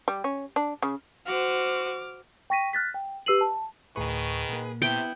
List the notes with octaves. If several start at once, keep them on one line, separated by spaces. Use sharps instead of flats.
G3
C#4
D4
C#3
F#4 C5 D6 F6
G5 C#6 A#6 B6 D#7
F6 F#6 A6 B6
G5
G4 B4 E6 C7 D#7 F#7
A5
D2 A2 D#3 G#4 B4 C#6
A#2 A#3
C3 B3 E4 G5